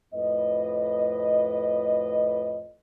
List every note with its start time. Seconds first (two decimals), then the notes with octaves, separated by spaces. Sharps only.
0.14 F2 A2 B4 D#5